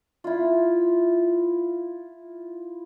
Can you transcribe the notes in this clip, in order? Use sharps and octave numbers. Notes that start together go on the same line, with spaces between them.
E4 F4